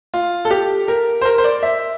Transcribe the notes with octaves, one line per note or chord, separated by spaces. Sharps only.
F4
A4
G4
A#4
C5
A#4
C5
D5
E5